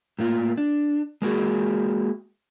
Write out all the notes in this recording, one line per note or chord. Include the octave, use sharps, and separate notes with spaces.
A2 A#3 F4
D4
G#3 A#3 F#4 G#4